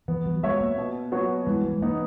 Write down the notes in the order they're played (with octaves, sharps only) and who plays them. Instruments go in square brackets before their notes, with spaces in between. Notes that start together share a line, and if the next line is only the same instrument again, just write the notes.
[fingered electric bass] E3 [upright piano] B3
[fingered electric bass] F#3
[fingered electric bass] G#3 [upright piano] F#4 C#5 E5
[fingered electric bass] A#3
[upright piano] B2
F#3 B3 F#4 C#5
[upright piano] E3 [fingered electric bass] G#3
[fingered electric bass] G#3
[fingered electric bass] A#3 [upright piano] B3 D#4